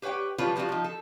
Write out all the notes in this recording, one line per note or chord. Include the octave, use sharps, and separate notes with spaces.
G4 B4 C#5 F#5 G5
E3 F3 G3 F4 B4 C#5
F3 G3 G#3 C4 F4 F#4
F3 D#4
A4